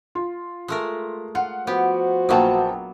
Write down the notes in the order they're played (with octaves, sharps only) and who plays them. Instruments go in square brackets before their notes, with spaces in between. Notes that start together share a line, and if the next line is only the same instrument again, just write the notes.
[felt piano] F4
[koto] G#3 A3 A#4
[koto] F4 [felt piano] F#5
[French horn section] F3 F#4 C5 [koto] B3 G4
[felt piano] A#1 G5 A5 [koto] F#3 A#3 B3